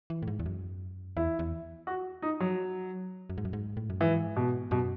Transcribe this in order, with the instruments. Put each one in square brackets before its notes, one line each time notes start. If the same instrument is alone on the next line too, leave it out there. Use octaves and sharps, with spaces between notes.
[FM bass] E3
A2
G#2
E2
F#2
[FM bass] E2 [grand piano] E4
[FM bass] E2
[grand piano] F#4
D#4
F#3
[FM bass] F#2
G#2
F#2
G#2
A2
F#2
[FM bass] G#2 [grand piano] E3
[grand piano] B2
[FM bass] F#2 [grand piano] B2